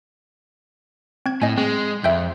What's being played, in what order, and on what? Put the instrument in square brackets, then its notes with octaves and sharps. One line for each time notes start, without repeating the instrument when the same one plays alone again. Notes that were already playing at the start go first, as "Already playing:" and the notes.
[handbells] C4 G#6
[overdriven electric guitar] A2 [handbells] D#5 G#5
[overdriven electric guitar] G#3 [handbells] C4
[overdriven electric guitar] F2 [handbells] E5 G5 G6